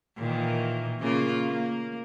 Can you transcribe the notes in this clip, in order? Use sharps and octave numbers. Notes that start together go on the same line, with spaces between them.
A#2 D#3 E3
C#3 A#3 F4
A#3